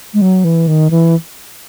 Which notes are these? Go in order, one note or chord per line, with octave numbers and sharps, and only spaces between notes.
G#3
F#3
E3
D#3
E3